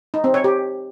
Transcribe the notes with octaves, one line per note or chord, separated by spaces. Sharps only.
D#4
C4
C#5
G4